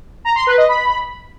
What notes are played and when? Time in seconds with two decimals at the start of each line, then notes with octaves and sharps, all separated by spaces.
0.25 A#5
0.36 C6
0.47 B4
0.58 D#5
0.69 B5